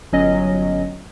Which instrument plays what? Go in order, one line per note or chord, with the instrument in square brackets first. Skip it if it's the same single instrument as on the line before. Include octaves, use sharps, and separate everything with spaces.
[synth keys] G1 F#3 C#4 D#5